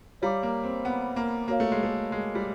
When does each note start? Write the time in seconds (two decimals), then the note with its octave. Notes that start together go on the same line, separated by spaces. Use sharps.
0.22 G3 C#5 F5 A#5 D6
0.43 A#3
0.64 C4
0.85 B3
1.16 A#3
1.48 A#3 F#4 A#4 C#5 F5
1.60 A3
1.72 G#3
1.83 A3
2.12 G#3
2.35 G3